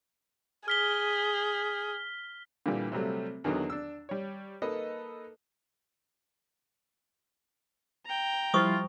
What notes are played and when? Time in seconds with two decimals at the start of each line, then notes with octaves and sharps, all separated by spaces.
0.68 G#4 F6 B6 G7
2.66 A#2 D3 E3 G3
2.92 C3 F#3 G3 A3
3.44 E2 D3 D#3 F#3 B3
3.70 D4 E6
4.09 G3 C#5
4.62 A#3 D#4 A4 B4 D#5
8.06 G5 A#5
8.54 F3 G3 E4 F4 C5 C#6 D#6